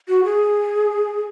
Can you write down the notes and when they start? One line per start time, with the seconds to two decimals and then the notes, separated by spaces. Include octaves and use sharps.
0.09 F#4
0.24 G#4